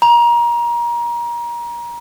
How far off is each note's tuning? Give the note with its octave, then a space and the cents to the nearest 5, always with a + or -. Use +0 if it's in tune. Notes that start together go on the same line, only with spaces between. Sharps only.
A#5 +25